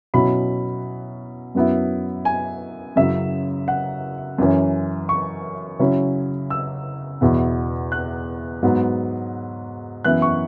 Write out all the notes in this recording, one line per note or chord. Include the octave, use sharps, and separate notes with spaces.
B2 F#3 C#4 E4 B5
F#2 F#3 B3 E4
G#5
F#2 C#3 F#3 E4 E5
F#5
F#2 E3 C#4
C#6
C#3 F#3 C#4 E4
E6
E2 B2 B3 E4
F#6
G#2 F#3 B3
F#2 E3 B3 E4 F#6
C#6